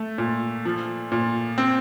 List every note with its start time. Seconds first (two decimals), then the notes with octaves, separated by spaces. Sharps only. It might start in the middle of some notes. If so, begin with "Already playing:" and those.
Already playing: A3
0.18 A#2
0.65 F3
1.12 A#2
1.58 C4